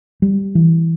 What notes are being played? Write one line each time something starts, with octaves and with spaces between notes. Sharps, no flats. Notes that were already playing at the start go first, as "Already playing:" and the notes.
G3
E3